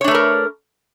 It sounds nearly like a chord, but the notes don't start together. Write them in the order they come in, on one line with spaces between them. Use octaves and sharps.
C#5 D4 A3 B4 A#4